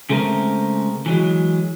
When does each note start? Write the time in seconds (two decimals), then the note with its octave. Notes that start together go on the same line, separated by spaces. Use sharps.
0.10 C#3 G#3 A3 C4 A#4
1.06 E3 F#3 G#3